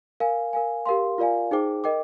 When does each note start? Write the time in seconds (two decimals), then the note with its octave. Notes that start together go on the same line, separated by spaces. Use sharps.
0.20 A#4 F5 G#5
0.53 A#4 F5 G#5
0.86 G4 A#4 F5 C6
1.18 F4 A#4 D5 F5 G#5
1.51 D#4 G#4 C5 G5 D6
1.84 A#4 D#5 G5 D6